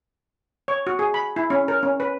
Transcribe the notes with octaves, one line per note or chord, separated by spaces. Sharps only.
C#5
F#4
G#4
B5
E4
C#4
A#4
C#4
B4